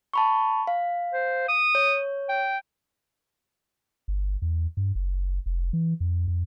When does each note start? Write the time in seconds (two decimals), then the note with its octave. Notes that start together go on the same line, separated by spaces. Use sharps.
0.14 A5 B5 C#6
0.67 F5
1.13 C5
1.48 D#6
1.75 C#5
2.29 G5
4.08 G1
4.42 E2
4.77 G2
4.95 F#1
5.46 F1
5.73 E3
6.00 F2
6.28 F2